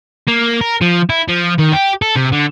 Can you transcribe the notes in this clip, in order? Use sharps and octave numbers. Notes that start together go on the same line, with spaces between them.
A#3
A#4
F3
E4
F3
D#3
G4
A4
C3
D3